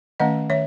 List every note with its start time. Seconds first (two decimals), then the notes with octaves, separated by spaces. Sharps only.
0.20 D#3 A3 C#4 D#5 F#5
0.50 D#3 C#5 E5